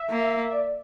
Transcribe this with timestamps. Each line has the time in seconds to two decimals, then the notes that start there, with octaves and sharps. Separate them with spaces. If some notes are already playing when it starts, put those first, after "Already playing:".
Already playing: E5
0.09 A#3
0.51 D5